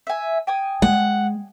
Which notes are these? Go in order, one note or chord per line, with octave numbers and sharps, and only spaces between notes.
E5 G#5
G5 G#5 D#6
G#3 F#5